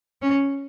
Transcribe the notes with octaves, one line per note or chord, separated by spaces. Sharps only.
C#4